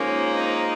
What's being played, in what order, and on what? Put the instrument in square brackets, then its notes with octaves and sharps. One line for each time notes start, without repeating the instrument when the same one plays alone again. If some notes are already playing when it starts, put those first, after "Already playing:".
Already playing: [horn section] G#2 F3 A#3 [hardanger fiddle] C#4
[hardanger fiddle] D#4